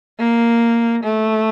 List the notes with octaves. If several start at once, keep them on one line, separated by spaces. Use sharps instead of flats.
A#3
A3